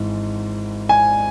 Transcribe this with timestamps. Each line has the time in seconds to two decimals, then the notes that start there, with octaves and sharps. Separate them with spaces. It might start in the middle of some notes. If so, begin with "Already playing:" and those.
Already playing: G#1 G#2 E3
0.89 G#5